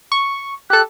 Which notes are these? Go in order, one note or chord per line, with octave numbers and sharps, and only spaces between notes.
C#6
G4 A4 F#6